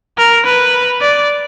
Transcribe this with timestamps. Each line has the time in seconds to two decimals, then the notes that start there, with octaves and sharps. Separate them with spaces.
0.18 A#4
0.46 B4
1.01 D5